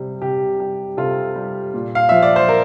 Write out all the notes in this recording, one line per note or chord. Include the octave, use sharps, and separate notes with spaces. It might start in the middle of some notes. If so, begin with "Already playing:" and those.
Already playing: C3 G3
C3 G4
G3 G4
C3 F4 A4
G3
A#2
F5
F3 E5
D5
C5
A#4